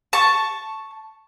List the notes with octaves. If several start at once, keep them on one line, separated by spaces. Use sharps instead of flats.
A5 C#6